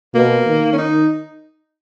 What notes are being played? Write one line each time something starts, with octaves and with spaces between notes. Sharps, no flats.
B2 A#3
D#3
C#4
D#4